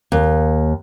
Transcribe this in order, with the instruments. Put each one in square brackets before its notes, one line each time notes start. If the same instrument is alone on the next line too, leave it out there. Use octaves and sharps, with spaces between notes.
[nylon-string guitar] D#2